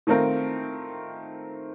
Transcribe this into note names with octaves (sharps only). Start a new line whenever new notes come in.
D#3 A3 C4 F4 A#4